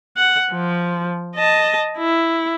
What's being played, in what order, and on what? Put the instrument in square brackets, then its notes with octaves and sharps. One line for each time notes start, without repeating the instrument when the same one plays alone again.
[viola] F#5
F3
D#5 A5
E4